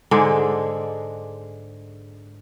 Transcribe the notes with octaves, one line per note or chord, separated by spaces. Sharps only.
G#2 D3 G#3 D4